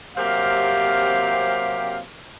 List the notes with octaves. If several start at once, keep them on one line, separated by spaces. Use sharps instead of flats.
C3 F#3 A#3 C4 G4 F5